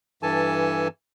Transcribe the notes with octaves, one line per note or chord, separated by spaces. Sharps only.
G2 E3 A4 G#5 A5